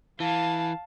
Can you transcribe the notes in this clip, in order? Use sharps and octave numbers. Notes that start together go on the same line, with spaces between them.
E3 F5 A5